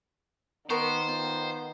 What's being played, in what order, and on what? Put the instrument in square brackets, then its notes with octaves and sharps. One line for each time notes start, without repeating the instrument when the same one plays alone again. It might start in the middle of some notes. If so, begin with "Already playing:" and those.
[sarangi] D#3 [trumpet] B3 [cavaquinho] A#4 C#6 [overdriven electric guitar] C5
[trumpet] B3 [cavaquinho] F4